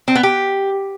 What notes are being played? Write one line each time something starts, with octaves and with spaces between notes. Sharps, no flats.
C4
B3
G4